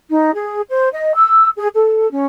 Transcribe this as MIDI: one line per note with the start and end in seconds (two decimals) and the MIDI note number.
0.10 0.31 63
0.34 0.61 68
0.69 0.89 72
0.94 1.13 75
1.15 1.50 88
1.57 1.68 68
1.74 2.07 69
2.11 2.27 61